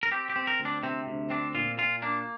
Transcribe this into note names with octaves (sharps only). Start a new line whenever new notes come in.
A#4
C4 G4
G4
C4
A#4
D2
D4
C3 C4
D2
C4 D4
A#2 F4
A#2 F4
A#3 D4